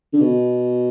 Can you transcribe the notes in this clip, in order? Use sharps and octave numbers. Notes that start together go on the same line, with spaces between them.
D3
B2